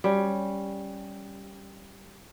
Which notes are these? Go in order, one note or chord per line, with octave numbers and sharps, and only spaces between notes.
G3 C#4